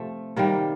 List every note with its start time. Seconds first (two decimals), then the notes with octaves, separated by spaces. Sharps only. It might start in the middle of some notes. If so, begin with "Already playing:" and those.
Already playing: C3 F3 A3
0.36 C3 D#3 G3 A#3